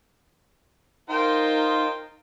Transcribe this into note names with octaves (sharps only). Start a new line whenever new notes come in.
D#4 F4 A#4 C5 G5